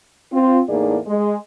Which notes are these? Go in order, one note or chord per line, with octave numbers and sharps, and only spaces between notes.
C4 F4
E2 A2 A#3 D#4 G#4 D5
G#3